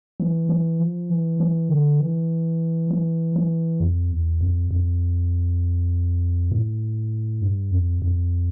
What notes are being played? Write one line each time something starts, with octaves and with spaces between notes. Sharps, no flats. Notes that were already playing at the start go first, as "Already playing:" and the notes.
E3
E3
F3
E3
E3
D3
E3
E3
E3
F2
E2
F2
F2
A2
G2
F2
F2